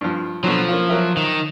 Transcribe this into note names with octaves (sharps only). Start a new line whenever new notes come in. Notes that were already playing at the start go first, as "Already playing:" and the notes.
G2 F3
B2 D3 F3 F#3
A#3 C#4 F4
F#3 A#4 E5
D#3